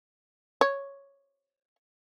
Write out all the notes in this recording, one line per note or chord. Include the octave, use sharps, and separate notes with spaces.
C#5